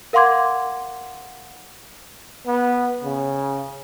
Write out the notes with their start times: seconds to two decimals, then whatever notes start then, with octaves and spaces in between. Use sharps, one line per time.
0.13 A#4 F5 F#5 C6 D6 G#6
2.47 B3
3.04 C#3